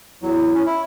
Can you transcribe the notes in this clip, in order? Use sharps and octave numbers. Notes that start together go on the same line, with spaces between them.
E2 F#3 E4
C#4
E4